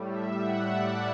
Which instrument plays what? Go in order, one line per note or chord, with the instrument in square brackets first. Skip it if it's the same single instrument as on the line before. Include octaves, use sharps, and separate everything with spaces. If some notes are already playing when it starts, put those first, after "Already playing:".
Already playing: [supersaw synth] A2 G3
E5
F#5
D5